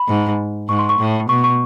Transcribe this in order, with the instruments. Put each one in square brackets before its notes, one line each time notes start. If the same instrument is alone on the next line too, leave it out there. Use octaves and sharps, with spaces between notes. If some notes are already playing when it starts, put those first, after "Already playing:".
Already playing: [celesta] B5
[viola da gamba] G#2
[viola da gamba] G#2 [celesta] C#6
[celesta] C6
C#6
[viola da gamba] A2
[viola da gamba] B2 [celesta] C#6
[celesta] C#6